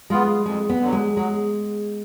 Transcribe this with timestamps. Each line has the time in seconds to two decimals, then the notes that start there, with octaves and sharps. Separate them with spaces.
0.10 G#3 B3 F4
0.46 F2 G#3
0.69 B3
0.81 D3 F#3
0.92 G#3
1.16 F#3 G#3